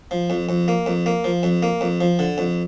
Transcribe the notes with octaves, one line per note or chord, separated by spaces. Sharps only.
F3
F2
F2
A#3
F2
A#3
F3
F2
A#3
F2
F3
D3
F2